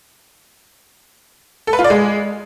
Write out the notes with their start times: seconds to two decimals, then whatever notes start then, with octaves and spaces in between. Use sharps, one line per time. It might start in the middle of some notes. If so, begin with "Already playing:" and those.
1.67 A4
1.73 B4
1.79 F4
1.84 D5
1.90 G#3